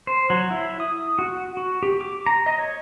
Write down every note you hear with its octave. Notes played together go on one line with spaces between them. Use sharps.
C5
F#3
E4
D#6
F#4
F#4
G4
D6
A#5
D#5
C#5